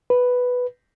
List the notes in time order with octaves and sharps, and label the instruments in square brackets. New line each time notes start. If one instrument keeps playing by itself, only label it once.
[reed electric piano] B4